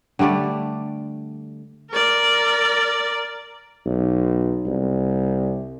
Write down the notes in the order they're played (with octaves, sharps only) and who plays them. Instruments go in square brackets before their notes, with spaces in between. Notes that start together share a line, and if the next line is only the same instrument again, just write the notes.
[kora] D3 G3 A3 D5
[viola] A#4 D5
[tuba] B1
C2